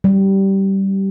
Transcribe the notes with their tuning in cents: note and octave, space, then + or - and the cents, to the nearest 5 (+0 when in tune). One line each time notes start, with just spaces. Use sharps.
G3 -15